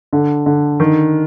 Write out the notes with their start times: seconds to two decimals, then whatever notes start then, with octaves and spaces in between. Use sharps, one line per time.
0.13 D3
0.46 D3
0.80 D#3